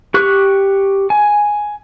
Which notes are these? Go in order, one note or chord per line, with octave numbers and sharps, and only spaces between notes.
G4 C#6 F#6
G#5